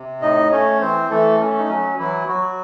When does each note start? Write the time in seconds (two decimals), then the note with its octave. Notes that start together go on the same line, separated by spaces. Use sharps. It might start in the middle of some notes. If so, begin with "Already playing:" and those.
Already playing: C3
0.21 A2 D#4 D#5
0.51 A3 C#4 C#5
0.80 E3 C4 C5
1.10 E3 A3 A4
1.40 A3 C#4
1.59 D#4
1.69 F#3 C#4
1.98 E3 F#3 E4
2.28 F#3 F#4